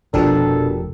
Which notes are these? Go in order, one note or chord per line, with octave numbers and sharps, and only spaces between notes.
F1 B2 F3 D4 G4 A4 A#4